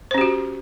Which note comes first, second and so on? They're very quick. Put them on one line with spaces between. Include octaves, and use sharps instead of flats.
C5 C#4 G4 F#4